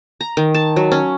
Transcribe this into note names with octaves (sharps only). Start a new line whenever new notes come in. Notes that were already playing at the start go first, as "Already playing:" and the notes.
A#5
D#3
A5
F#3
C#4